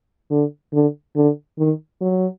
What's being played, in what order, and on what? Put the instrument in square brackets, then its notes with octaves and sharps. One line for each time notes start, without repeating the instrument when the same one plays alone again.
[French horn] D3
D3
D3
D#3
F#3